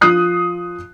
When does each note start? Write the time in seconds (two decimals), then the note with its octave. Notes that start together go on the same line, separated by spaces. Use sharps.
0.01 F3 F4 D#6 F#6 C7